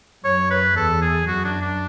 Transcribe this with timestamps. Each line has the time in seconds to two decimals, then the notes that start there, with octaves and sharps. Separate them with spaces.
0.24 F#2 C#5
0.50 B4
0.76 E2 A4
1.02 G#4
1.27 F#2 F#4
1.44 D4
1.61 D4